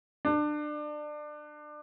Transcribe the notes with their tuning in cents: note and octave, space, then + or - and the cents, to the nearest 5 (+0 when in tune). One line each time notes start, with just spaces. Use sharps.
D4 +25